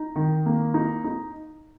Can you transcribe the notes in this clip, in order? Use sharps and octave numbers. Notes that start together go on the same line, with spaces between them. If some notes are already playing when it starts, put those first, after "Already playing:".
Already playing: D#4
D#3
A#3
D#4
D#4